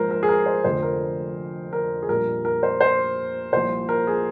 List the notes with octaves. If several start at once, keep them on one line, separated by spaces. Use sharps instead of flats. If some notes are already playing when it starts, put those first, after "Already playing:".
Already playing: A#1 G#2 F3 A#4 C5
A#4
G#4
A#4
C5
F1 F2 D3 F3 C5
A#4
A#4
G#4
A#1 A#2 G3 A#4
A#4
C5
C5
C2 A#2 F3 C5
A#4
G#4